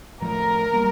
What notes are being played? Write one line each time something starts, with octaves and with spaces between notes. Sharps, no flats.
A2 F3 A3 A#4
G3 A#3